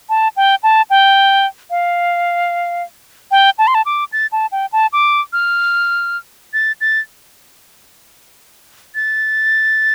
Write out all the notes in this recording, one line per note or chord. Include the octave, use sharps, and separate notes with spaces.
A5
G5
A5
G5
F5
G5
A5
C6
A5
D6
A6
A5
G5
A5
D6
F6
A6
A6
A6